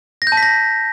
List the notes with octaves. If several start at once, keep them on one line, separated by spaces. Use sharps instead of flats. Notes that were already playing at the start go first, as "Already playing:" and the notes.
A#6
G6
A5
B6
A#6